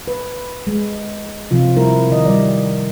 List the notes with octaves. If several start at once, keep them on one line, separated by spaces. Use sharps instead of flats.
B4
G#3
C3 F3 F4
G3 E4 A#4
D#3 D#5
G3 D5